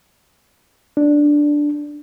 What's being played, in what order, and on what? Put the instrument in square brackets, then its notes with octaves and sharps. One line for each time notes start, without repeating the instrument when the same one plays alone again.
[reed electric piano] D4